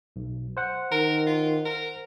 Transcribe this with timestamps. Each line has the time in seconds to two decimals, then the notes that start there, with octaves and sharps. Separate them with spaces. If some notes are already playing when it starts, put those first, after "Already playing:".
0.16 B1
0.57 C5 F#5
0.92 D#3 A#4
1.27 F4
1.65 A#4